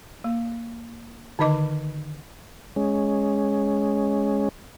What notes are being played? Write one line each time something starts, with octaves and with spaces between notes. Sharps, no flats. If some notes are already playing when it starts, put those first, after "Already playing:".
A#3
D3 D#3 D#4 D#5 D6
G#3 C#4